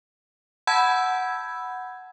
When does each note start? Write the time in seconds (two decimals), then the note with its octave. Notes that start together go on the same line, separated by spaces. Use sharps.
0.67 F#5 A5 B5 E6 G6 G#6